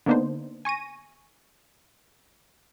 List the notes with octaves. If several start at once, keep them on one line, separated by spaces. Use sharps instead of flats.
D3 A#3 B3 D4 D#4 C5
G#5 C#6 A#6 D#7